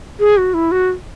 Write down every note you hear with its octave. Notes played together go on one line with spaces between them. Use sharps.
G#4
F#4
E4
F#4